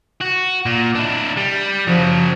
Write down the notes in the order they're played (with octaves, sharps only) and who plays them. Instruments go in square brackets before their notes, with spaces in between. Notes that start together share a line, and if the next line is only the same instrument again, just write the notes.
[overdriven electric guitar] F#4
A#2
D4 E4
G3
[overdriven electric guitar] C#3 F#3 [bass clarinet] F3